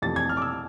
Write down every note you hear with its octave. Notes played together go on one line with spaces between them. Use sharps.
F2 C3 E3 A3 A6
G#6
F6
D6
E6